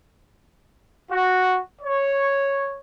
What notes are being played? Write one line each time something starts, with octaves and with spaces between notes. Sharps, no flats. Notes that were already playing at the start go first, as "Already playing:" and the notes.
F#4
C#5